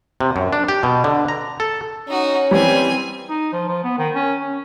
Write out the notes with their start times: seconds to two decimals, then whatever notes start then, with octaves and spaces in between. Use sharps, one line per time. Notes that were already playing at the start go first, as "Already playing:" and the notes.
0.21 C3
0.36 F#2
0.53 D4
0.68 G4
0.83 B2
1.04 D3
1.28 A#5
1.60 A4
2.08 C#4 D#4 F#4
2.51 E3 G3 C4 G#5
3.29 D#4
3.53 F3
3.68 F3
3.84 B3
3.98 D#3
4.15 C#4
4.39 C#4